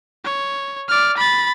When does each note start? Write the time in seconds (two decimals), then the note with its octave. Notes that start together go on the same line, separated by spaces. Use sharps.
0.25 C#5
0.88 D5 F6
1.17 B5 A6